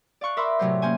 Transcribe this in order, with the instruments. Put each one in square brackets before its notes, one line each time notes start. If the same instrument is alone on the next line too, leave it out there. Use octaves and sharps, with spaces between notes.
[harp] D5 F5 C#6 F#6
A#4 E5 B5 C6 D6 E6
A2 C3 F#3 C5
A#3 C#4 C5 G#5